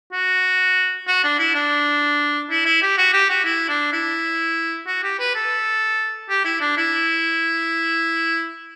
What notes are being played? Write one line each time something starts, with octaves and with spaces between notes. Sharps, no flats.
F#4
F#4
D4
E4
D4
E4
E4
G4
F#4
G4
F#4
E4
D4
E4
F#4
G4
B4
A4
G4
E4
D4
E4